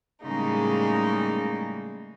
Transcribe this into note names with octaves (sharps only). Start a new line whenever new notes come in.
A2 C#3 G3 G#3 A#3 D#4